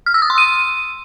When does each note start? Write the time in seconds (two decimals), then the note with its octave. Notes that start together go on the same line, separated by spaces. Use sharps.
0.06 F6
0.14 E6
0.22 D#6
0.30 C6
0.38 D#7